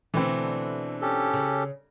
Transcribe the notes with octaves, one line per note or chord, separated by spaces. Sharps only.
B2 D3 E3 A3 C4
C#4 G4 A4
C#3